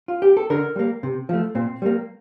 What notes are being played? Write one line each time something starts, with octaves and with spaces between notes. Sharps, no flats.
F4
G4
A4
D3 A#4
G3 A#3
C3
F3 A3
A#2 C4
G3 A#3